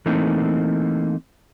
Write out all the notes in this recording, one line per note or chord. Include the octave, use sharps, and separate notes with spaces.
E3 A3 A#3 C4 D#4